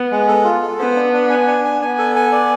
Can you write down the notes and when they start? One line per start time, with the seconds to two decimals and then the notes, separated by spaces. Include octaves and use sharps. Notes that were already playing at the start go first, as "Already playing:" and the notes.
Already playing: B3
0.11 G#3
0.28 A4
0.44 F4
0.62 A4
0.79 B3 C5
0.96 D4
1.13 D4
1.30 G#5
1.46 D4
1.65 G#5
1.80 B3 G#5
1.99 A4
2.16 G#5
2.32 D5